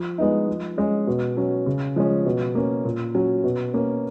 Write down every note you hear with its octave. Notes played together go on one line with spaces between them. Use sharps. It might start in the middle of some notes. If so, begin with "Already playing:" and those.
Already playing: F3
G#3 B3 D#4
F3
G#3 C#4
B2
F#3 C#4
C#3
F3 G#3 C#4
B2
A#3 C#4
A#2
F#3 C#4
B2
A#3 C#4